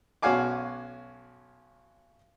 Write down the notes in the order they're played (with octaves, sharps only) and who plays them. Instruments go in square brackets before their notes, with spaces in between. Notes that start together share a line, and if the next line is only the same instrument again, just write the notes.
[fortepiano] B1 C#4 F#4 F5 G#5 D6